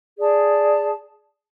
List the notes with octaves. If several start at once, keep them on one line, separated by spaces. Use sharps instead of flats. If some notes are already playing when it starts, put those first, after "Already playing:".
G#4 D5 A5